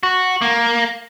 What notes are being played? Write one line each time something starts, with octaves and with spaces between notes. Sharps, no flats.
F#4
A#3